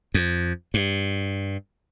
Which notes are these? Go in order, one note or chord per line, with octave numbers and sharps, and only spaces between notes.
F2
G2